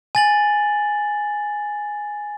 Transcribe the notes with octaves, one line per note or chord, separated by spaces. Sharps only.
G#5 A6 F#7